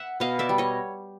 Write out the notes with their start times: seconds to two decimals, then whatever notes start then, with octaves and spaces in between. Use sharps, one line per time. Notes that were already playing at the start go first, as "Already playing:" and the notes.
Already playing: E5 F#5
0.20 B2 D#5 F5
0.39 D5 E5
0.49 G3
0.58 C#5 D#5